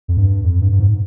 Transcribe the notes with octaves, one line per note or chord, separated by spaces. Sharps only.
F2
G2
F2
G2
G2
G#2